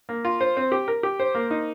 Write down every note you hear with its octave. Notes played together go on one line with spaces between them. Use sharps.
A#3
F4
C5
C4
G4
A#4
G4
C5
A#3
D#4